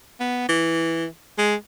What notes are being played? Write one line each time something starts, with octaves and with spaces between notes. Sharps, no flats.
B3
E3
G#3